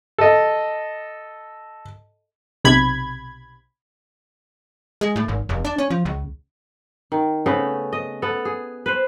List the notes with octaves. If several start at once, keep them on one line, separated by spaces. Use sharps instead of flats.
A4 D#5
B1 C3 B5 G#6
G#3
A2
G#1
F1
D4
C#4
F3
C#2
D#3
C#3 A3 B3
D#5
B3 A4
G#4
B4 C5